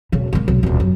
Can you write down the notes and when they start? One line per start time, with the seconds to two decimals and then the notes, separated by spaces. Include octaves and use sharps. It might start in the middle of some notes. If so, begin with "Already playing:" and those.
0.12 E1 C#3
0.33 G#3 A#3
0.48 B1
0.63 D#1 C#2
0.80 F#2